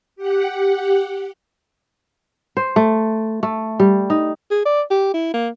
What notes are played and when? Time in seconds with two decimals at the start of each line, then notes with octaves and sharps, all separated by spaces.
0.16 G4 F#5
2.57 C5
2.76 A3
3.43 A3
3.80 G3
4.10 D#4
4.51 G#4
4.66 D5
4.91 G4
5.14 E4
5.34 A#3